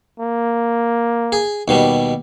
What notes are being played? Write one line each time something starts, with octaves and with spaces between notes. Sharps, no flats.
A#3
G#4
D#2 B2 G3